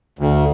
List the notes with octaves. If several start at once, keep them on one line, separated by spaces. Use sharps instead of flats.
D2